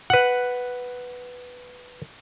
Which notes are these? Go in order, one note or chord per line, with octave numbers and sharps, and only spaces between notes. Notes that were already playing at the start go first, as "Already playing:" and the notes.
B4 F#5